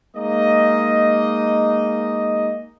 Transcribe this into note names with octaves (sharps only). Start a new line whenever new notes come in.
G#3 A#3 D#4 D#5